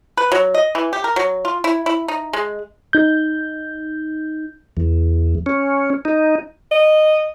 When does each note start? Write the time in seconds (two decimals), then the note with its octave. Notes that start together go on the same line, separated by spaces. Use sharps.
0.17 B4
0.32 F#3
0.54 D#5
0.75 E3
0.93 G4
1.04 A#4
1.16 F#3
1.45 F4
1.64 E4
1.86 E4
2.08 D#4
2.33 G#3
2.93 D#4 G6
4.77 E2
5.46 C#4
6.05 D#4
6.72 D#5